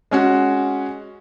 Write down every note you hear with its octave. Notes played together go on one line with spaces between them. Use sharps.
G#3 C#4 F#4